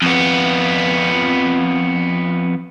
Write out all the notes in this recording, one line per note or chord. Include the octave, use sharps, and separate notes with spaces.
F2 B3